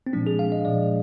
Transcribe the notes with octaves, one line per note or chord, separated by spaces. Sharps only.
C4
A#2 F3 G#3 D4
G#4
F5
D#5
A#2 F3 G#3 D5